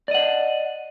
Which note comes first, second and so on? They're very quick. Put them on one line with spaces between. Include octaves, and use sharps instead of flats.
D5 D#5 F#5